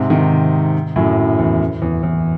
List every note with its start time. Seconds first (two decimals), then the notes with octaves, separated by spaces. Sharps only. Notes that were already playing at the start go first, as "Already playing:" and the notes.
Already playing: G#2 C3
0.10 C3 D#3
0.96 F#2 A2
1.39 E2
1.82 E2
2.03 E2